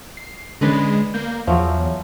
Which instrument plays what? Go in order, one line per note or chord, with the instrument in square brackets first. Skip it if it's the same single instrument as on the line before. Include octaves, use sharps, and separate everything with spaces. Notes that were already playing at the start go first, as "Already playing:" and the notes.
[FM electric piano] C7
[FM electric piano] D3 C#4 [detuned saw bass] G#3 [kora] B4 D5 D#5
[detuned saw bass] A#3 [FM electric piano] G6
[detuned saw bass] E2 [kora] F3 F#3 [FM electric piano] C#5 E5